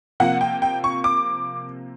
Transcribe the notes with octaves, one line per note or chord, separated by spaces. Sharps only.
C3 F3 A#3 F#5
G5
G5
C#6
D6